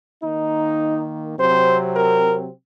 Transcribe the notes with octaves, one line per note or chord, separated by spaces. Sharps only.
D#3 A#3 D#4
C3 F#3 C4 C5
A#4